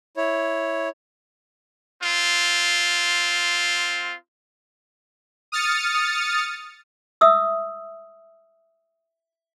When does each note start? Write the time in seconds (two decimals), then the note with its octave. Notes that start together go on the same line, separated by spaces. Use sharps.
0.17 E4 C#5
2.03 C4 F4
5.52 D#6 F6 A6 C#7
7.21 E5 D#6 E6